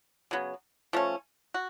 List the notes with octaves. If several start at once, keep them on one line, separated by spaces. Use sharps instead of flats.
C#3 F#3 B3
F3 A3 C#4
F#4